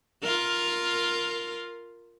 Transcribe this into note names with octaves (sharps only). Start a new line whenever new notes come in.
F4 A#4